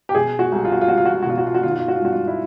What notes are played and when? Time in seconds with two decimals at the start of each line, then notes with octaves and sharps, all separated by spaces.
0.09 G4
0.15 B2 G#4
0.39 F#4
0.52 C2
0.65 F4
0.72 F#4
0.81 F4
0.88 C2 F#4
0.98 F4
1.05 F#4
1.14 F4
1.23 F#4
1.26 B2 F4
1.38 F#4
1.47 F4
1.55 F#4
1.63 D#3 F4
1.71 F#4
1.79 F4
1.88 F#4
1.96 F4
2.01 G2 F#4
2.12 F4
2.28 E4